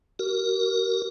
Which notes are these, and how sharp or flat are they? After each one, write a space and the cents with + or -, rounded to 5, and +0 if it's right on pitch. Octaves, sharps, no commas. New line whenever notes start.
F#4 +45 A#4 +0